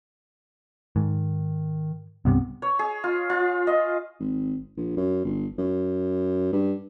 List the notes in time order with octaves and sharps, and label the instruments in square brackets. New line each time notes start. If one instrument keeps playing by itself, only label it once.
[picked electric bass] G#2 [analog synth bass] D#3
[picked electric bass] C2 G2 C3 [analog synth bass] B3
[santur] C#5
G#4
F4
F4
D#5
[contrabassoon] G#1
A#1
F#2
G1
F#2
G2